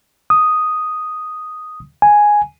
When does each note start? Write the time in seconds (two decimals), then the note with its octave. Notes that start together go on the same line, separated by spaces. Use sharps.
0.30 D#6
2.02 G#5